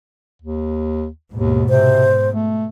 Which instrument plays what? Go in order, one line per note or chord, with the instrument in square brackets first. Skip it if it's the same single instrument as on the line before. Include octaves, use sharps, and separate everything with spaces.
[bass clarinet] D#2
[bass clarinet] D#2 [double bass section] G#2 B2
[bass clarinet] C3 [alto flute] C5
[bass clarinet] A3